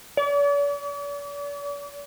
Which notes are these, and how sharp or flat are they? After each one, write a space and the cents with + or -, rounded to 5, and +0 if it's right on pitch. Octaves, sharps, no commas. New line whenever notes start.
D5 -45